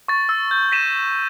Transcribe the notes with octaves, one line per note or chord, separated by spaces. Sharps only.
C#6 A6
E6
G6
A#6 B6 D#7 E7